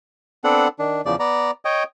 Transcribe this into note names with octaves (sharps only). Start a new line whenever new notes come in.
B3 C4 D4 A4 F#5
D#3 D4
E2 C#3 F3 D5
B3 D5 A#5
C#5 D#5 G5